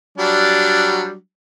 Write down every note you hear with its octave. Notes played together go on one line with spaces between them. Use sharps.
F#3 G3 D4